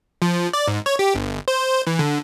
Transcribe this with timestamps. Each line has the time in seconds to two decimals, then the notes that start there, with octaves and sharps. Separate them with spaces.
0.22 F3
0.53 D5
0.68 G#2
0.86 C#5
0.99 G4
1.15 G1
1.48 C5
1.87 E3
1.99 D3